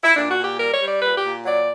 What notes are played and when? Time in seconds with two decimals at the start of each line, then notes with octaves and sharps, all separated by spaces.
0.04 E4
0.16 A#2 D4
0.30 F#4
0.37 A#2
0.44 G4
0.59 G3 A#4
0.74 C#5
0.81 G3
0.88 D5
1.02 A#2 B4
1.17 G4
1.24 A#2
1.45 F#3 D5